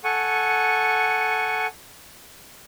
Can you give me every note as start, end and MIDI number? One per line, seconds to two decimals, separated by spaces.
0.04 1.67 69
0.04 1.67 78
0.04 1.67 80
0.04 1.67 85